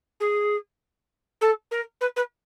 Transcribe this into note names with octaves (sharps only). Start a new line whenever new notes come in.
G#4
A4
A#4
B4
B4